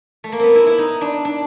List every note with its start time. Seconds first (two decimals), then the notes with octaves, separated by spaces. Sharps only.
0.24 A3
0.32 A#3
0.40 B3 C4
0.55 E4
0.67 E4
0.78 D#4
1.01 D4
1.25 D4